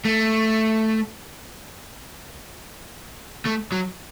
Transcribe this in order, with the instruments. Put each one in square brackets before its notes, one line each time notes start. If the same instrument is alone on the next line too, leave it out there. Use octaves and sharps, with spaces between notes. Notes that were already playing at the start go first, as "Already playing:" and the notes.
[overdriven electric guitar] A3
A3
F#3